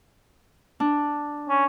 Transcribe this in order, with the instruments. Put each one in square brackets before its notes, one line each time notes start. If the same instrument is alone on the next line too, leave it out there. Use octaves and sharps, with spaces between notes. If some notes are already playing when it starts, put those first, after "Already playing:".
[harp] D4
[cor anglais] C#4